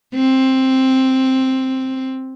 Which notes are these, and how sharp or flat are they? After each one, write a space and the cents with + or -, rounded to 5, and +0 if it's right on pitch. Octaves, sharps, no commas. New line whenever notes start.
C4 +5